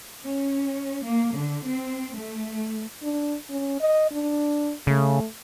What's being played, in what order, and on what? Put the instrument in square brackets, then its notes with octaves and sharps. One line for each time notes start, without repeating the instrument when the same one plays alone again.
[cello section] C#4
A#3
D3
C4
A3
[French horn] D4
C#4
D#5
D4
[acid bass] C#3 [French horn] A3